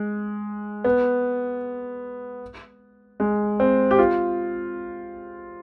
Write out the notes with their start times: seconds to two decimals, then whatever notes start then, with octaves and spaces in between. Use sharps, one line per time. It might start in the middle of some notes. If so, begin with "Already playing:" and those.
Already playing: G#3
0.84 B3
3.20 G#3
3.60 C4
3.91 G4
3.99 F4